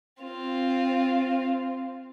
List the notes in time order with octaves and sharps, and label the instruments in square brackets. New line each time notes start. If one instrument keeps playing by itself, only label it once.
[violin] C4 F4